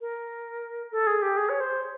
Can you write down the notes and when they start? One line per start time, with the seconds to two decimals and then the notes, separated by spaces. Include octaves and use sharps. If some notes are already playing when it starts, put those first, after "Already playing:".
0.01 A#4
0.92 A4
1.07 G#4
1.22 G4
1.37 G#4
1.49 C#5
1.60 C5